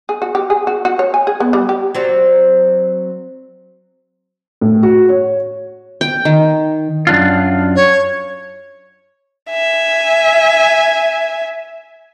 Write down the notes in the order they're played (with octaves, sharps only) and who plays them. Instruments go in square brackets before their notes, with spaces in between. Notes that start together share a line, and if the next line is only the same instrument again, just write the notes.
[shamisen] G#4
F#4
G4
G#4
F#4
F#4
C#5
G#5
G#4
B3
G3
G4
[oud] F#3 C4 D5
[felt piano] A2
F#4
C#5
[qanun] G5
D#3
[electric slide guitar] F#2 D4 F4
[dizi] C#5
[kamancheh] E5 G#5